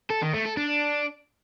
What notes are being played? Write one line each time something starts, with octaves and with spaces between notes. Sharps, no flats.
A4
D#3
A3
A4
D4